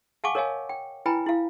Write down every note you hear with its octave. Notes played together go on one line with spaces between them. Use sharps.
F5 F#5 G#5 A5 C#6 D6
A#4 C#5 D#5 F5 G#5
G5
E4 B4 G5 G#5 A#5 B5
E4 F5